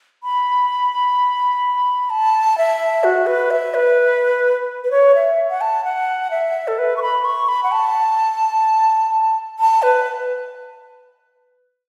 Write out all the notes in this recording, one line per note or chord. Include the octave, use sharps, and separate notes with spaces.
B5
A5
E5
F#4
B4
E5
B4
B4
C#5
E5
F#5
A5
F#5
E5
A4
B4
C#6
B5
C#6
B5
F#5
A5
A5
B4